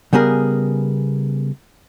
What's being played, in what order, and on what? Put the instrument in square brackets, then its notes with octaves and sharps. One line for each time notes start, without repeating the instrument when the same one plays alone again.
[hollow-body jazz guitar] C#3 G3 B3 G#4 A#4